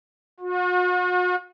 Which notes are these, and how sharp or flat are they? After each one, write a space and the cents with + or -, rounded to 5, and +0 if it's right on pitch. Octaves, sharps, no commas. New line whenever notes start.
F#4 -45